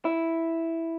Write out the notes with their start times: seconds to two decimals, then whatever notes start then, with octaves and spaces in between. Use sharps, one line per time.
0.05 E4